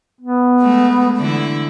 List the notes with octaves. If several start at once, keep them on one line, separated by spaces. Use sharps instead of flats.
B3
G#3 A3
D3 E3 E4